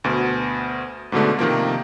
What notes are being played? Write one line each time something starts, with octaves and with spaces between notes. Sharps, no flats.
D2 B2
G#2 B2 D3 A3
C3 D#3 F3 A#3